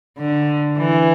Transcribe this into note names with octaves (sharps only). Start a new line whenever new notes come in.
D3
E3